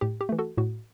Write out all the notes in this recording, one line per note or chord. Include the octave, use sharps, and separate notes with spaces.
A2 G4
G4
E3 A3
F#4 A4
A2 F#4